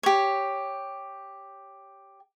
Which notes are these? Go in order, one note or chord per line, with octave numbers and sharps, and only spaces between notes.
G4 C#5